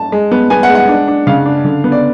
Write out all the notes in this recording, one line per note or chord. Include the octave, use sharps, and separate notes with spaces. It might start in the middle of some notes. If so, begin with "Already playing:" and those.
Already playing: A5
G#3
B3
B3 G#5
F#5
G#3
F#5
D4
D4
C#3 F5
D4
D3
B3
D5